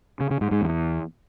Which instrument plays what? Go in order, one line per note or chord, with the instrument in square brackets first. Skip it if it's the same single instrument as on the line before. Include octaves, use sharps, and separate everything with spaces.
[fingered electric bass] C#3
C#3
G#2
G#2
E2